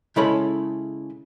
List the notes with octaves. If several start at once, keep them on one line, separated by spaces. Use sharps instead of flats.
C#3 G#3 E4 A4 C#5 B5